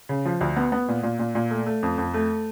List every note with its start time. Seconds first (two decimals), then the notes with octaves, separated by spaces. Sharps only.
0.09 C#3
0.25 F3
0.41 D2
0.57 B3
0.72 B3
0.88 A#2
1.03 A#2
1.19 A#2
1.35 A#2
1.51 A3
1.66 A3
1.83 F2
1.98 F2
2.14 A3